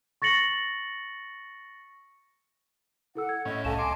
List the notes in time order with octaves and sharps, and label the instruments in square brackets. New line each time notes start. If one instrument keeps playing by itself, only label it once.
[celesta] C#6 A6 A#6 C#7 F#7
[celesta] E4 A4 E6 [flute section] F#5
[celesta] G#6
[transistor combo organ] A2 C#4 [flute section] D#5 [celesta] G#6
[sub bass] C2 [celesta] A4 F5 E7 [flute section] D#5 G#5 A5
[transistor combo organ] C6 D6